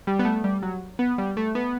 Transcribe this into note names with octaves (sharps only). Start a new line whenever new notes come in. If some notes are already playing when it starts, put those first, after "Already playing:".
G3
B3
A3
G3
F#3
B3
G3
A3
B3